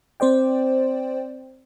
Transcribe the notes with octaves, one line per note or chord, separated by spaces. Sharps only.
C4 C5 D5 G5